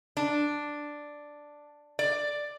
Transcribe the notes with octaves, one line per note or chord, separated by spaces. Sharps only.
D4
D5